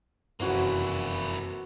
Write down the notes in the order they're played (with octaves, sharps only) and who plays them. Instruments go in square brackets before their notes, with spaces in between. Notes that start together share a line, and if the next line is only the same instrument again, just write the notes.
[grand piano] F1 E3 F#5 [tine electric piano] F#2 [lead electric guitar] A#3 E4 [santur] F#4 C5